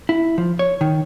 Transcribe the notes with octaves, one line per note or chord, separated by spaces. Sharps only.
E4
F3
C#5
D#3